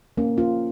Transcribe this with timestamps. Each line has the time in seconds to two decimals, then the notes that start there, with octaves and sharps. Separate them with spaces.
0.17 A#3 C#4
0.37 C#4 F4